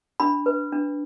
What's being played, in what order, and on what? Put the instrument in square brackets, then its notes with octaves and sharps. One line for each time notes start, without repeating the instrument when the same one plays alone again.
[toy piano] D4 B5
B4
D4